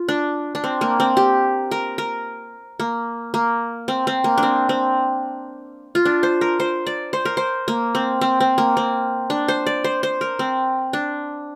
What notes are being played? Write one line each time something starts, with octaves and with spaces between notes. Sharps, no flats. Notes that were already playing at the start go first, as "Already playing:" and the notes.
Already playing: F4
D4
D4
C4
A#3
C4
G4
A#4
A#4
A#3
A#3
C4
C4
A#3
D4
C4
C4
F4
D4
C5
A#4
C5
D5
C5
A#4
C5
A#3
C4
C4
C4
A#3
C4
D4
C5
D5
C5
C5
A#4
C4
D4